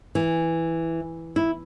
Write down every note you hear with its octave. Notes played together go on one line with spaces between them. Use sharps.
E3
E4